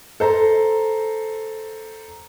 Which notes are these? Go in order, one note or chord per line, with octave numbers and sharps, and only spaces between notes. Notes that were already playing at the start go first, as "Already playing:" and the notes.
A4 C5 A#5